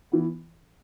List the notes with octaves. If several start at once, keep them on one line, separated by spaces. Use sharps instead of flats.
E3 B3